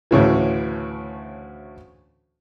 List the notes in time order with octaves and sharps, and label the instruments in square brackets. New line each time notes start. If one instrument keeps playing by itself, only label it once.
[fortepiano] D2 A2 C#3 E3